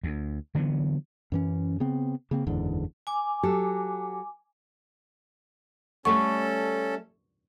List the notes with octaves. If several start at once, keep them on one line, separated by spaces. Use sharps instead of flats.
D2
D3 E3 F#3 B3
F#2 E3 C#4
C#3 B3 C4
C#3 A#3 C4
F#1 E2 G#2 D3
G#5 D6
F#3 G4 A4
G3 A3 C#4 A4 F#5 C#6